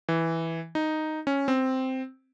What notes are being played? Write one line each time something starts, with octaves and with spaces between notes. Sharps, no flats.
E3
D#4
C#4
C4